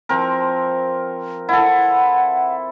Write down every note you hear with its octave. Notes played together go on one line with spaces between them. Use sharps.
F3 C4 A#4
E4 A4 F#5